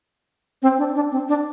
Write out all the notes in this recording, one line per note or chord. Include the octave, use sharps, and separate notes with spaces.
C4
D4
D4
C4
D4